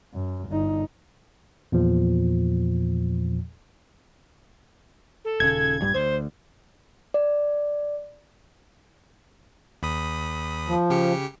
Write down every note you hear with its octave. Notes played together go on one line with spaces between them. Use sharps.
F#2
G1 D#4
E2 A#2 F3
A4
D#1 C#3 G#6
A#1 G2 G3
D2 C5
D5
D#2 B5 D#6
F3
C#3 G4 C#7